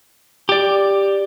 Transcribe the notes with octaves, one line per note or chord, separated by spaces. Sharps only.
G4 D5